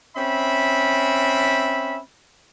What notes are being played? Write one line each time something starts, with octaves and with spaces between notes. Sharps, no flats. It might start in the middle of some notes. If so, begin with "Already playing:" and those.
C4 C#4 E5 B5